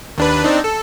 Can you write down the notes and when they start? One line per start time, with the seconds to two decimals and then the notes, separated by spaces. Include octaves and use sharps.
0.18 D#2 D4 B4
0.44 C4 D4 D#4
0.64 A4